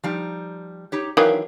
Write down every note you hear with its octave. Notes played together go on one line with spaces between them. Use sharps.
F3 G3 D#4
D#4 G4 C#5
D#3 E3 F#3 D4 E5 F5